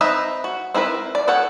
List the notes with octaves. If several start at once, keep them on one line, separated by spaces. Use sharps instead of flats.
C4 D#4 B4 E5 A#5
F#4
C4 E4 A#4 B4
D5
F#4 A4 C#5 F#5 G5